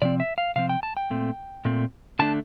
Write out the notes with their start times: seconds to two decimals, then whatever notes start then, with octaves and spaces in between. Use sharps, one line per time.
0.02 C3 F3 C4 D5
0.20 E5
0.38 F5
0.56 C3 F3 C4 F5
0.69 G5
0.83 A5
0.97 G5
1.10 A#2 A3 C4
1.65 A#2 A3 C4
2.19 D3 A3 D4 A5